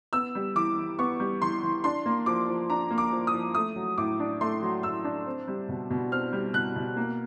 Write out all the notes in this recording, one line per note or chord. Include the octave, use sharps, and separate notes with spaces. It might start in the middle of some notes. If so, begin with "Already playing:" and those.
B3 E6
G3
E3 D6
E3
B3 C#6
G3
E3 C6
E3
D4 C6
A#3
F3 D6
F3
D4 A#5
A#3
D6
F3
D#6
F3
A3 D#6
F#3
A2 D6
D4
A3 C6
F#3
A2 E6
D4
C4
G3
B2
B2
C4 F6
G3
B2 F#6
B2
A#3